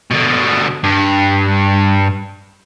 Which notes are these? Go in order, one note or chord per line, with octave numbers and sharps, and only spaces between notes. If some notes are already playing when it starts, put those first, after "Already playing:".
B2 D3
G2